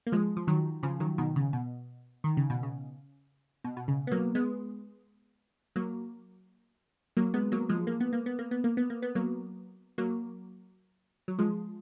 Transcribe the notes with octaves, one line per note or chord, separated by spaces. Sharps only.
A#3
F3 G#3
F3
D#3 F#3
C#3 F3
D#3 F#3
B2 D#3
C#3
B2
D#3
C#3
B2
C#3
B2
B2
C#3
B3
F#3 A#3
G#3 B3
F#3 A#3
F#3 A#3
G#3 B3
F#3 A#3
F3 G#3
A#3
B3
A#3
B3
A#3
B3
A#3
B3
A#3
B3
F#3 A#3
F#3 A#3
F#3
F3 G#3